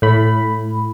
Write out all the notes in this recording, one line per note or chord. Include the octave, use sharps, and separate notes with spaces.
A2 B5